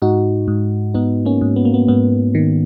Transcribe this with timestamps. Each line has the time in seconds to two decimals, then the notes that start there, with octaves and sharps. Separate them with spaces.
0.02 G#2 D#4 F#4
0.48 G#2
0.94 G#2 B3 D#4
1.25 A#3 C#4
1.41 G#2
1.56 B3
1.65 A#3
1.74 B3
1.88 G#2 B3
2.35 D#3